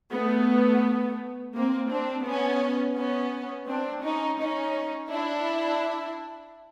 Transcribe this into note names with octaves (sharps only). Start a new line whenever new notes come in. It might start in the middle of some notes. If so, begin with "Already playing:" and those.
A3 B3
A#3 C4
C4 D4
B3 C#4
B3 C#4
C4 D4
C#4 D#4
C#4 D#4
D4 E4